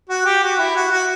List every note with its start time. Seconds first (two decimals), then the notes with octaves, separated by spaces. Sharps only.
0.09 F#4
0.26 G4
0.43 F#4
0.59 E4
0.76 F#4
0.91 F#4